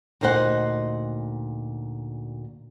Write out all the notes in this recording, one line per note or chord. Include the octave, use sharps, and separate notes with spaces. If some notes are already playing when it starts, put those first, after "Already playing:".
D2 A#2 D#4 C5 D#5 F#5